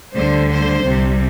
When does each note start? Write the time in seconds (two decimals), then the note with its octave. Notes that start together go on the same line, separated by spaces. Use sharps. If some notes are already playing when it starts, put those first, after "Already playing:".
0.14 D2 D3 G3 C5
0.50 C5
0.85 C2 C3 G3